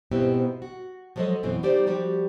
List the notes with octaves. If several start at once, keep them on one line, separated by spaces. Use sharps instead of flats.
G#2 B2 B3 C4 E4 G4
F#4
F3 F#3 G#3 G#4 A4 D#5
F#2 B2 E3 C4
G3 D#4 G4 C5 D5
F3 G3 F#4 G4